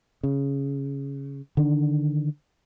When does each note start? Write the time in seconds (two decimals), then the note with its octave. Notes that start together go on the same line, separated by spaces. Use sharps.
0.23 C#3
1.57 D3 D#3 D4